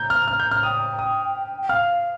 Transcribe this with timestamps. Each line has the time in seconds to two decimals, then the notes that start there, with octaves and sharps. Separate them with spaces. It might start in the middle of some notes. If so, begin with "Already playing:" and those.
Already playing: A#5 G6
0.10 F6
0.28 F6
0.40 G6
0.51 F6
0.63 G5 D#6
0.99 D#6
1.62 G5
1.69 F5 F6